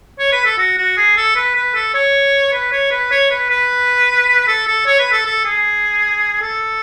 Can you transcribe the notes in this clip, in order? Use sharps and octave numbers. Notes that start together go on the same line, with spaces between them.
C#5
B4
A4
F#4
F#4
G#4
A4
B4
B4
A4
C#5
B4
C#5
B4
C#5
B4
B4
A4
A4
C#5
B4
A4
A4
G#4
A4